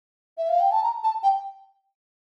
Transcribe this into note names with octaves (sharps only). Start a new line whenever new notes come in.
E5
F5
G5
A5
A#5
A5
G5